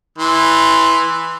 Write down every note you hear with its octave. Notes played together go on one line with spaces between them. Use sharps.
E3 C6